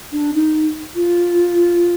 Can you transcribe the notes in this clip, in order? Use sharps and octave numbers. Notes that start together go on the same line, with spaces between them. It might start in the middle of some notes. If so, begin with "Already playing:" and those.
D4
D#4
F4